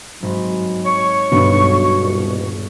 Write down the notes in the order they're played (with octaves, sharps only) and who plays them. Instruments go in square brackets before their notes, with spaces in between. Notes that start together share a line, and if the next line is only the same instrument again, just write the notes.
[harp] G#1 G#2 [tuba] F#3
[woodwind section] C#5 C#6
[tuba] B1 [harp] G2 [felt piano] B2 D3
[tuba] D#1